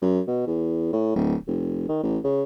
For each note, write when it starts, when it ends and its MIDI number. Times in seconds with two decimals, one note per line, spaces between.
0.02 0.20 42
0.27 0.43 47
0.47 0.90 40
0.93 1.14 45
1.15 1.35 26
1.47 1.87 29
1.89 2.02 51
2.03 2.18 33
2.24 2.43 49